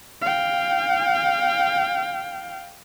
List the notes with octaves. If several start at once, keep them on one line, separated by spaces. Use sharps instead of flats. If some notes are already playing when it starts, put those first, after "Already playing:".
F5 G5